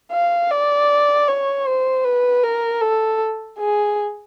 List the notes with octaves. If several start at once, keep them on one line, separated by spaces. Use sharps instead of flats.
F5
D5
C#5
C5
B4
A#4
A4
G#4